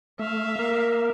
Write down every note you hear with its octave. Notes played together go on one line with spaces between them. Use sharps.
A3 E5 F5
A#3 A#4